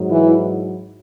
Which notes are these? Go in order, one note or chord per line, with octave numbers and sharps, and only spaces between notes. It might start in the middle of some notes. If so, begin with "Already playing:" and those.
Already playing: G#2 F#3
E3 E4